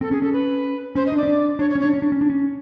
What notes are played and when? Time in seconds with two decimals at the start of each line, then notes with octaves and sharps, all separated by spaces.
0.01 C4 A4
0.11 C#4 G#4
0.22 C#4 A4
0.33 B4
0.95 C#4 C5
1.07 D#5
1.12 D4 D5
1.23 C#4
1.28 D4
1.59 D4 C#5
1.70 C#5
1.75 C#4
1.80 C#5
1.84 D4
1.93 C#4
2.02 D4
2.12 C#4
2.21 D4
2.30 C#4